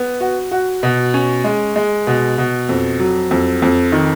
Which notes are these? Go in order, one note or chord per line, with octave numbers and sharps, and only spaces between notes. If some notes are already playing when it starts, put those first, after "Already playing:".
Already playing: B3
F#4
F#4
B2
C#4
G#3
G#3
B2
B2
F2
F#3
F2
F2
D#3